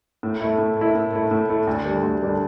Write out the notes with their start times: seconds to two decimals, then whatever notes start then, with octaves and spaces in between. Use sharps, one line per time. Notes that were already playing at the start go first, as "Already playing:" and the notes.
0.23 A2
0.41 A3 E4
0.58 A2
0.77 A3 E4
0.95 A2
1.13 A3 E4
1.31 A2
1.49 A3 E4
1.67 D2
1.85 D3 G3 D4
2.03 D2
2.21 D3 G3 D4